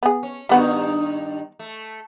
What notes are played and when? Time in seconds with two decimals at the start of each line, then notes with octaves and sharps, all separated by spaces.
0.03 B3 G#4
0.23 C#4
0.49 G2 D#3 G3 B3 F#4
1.59 A3